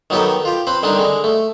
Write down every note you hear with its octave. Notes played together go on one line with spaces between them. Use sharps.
D#3 F#3 B3 G4 A4
F4 G4
C4 B4 C5
D3 D#3 G3 C4 D4
D3 G#3
A3